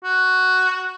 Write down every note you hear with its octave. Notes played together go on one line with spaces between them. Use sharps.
F#4